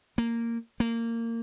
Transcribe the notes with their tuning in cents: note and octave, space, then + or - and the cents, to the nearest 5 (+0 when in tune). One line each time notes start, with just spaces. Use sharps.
A#3 -10
A#3 -20